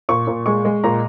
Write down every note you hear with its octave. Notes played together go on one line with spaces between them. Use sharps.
A#2 C#6
A#2
G#3 C#6
G#3
A#2 A#5